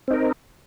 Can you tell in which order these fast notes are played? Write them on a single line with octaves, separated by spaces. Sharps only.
C4 D#4 A#4